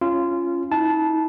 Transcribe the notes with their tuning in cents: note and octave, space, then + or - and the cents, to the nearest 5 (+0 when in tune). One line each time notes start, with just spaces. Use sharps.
C#4 +0 F4 -20
D#4 +45 A5 -15